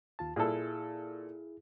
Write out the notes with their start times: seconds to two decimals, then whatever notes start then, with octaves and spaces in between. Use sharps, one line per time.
0.19 D#2 F4 A5
0.36 A#2 E4 G#4 A4